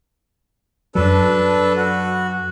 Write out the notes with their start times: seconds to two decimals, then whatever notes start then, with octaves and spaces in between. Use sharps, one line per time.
0.95 F#2 F#3 D4 A4 B4
1.77 F#4